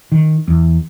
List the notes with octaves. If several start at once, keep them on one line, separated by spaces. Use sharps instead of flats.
D#3
E2